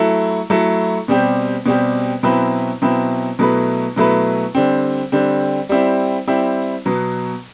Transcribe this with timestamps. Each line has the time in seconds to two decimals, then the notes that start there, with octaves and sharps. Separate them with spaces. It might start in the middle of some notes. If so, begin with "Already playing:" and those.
Already playing: F#3 A3 E4 A4
0.50 F#3 A3 E4 A4
1.08 B2 G3 C4 G4
1.66 B2 G3 C4 G4
2.23 B2 F#3 C4 E4 B4
2.82 B2 F#3 C4 E4 B4
3.39 B2 F#3 A3 E4 B4
3.96 B2 F#3 A3 E4 B4
4.55 D3 G3 C4
5.12 D3 G3 C4
5.69 G3 C4 E4
6.27 G3 C4 E4
6.86 B2 F#3 B3